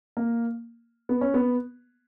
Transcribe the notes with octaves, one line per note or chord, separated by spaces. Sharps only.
A#3
B3
C#4
B3